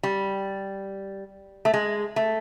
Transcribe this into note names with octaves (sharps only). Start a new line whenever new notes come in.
G3
A3
G#3
A3